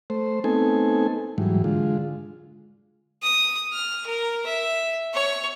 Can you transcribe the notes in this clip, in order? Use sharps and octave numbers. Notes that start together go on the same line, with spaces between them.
A3 C5
A3 B3 C4 D#4 A4 G#5
G#2 E3 F#3 G3
D3 G#3 F4
D#6
F6
A#4
E5
C#5